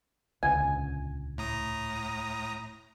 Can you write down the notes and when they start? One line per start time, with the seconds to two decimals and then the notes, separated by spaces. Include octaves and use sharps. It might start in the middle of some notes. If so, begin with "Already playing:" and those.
0.43 D#1 C#2 D3 G#5
1.38 A2 A#5 D#6